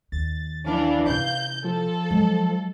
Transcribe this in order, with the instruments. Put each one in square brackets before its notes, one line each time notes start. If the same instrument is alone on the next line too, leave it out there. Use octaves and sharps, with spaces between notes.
[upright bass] D#2 [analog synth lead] A6
[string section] E3 D4 [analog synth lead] F5
[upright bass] C3 E4 [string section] G6
[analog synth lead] F3 [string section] A4
[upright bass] F#3 G#3